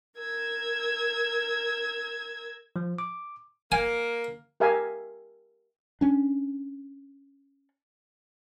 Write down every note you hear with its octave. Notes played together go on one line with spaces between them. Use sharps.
A#4 E6 G#6
F3
D6
A#3 G#5
G4 A#4 E5 F5 G#5
C#4 D4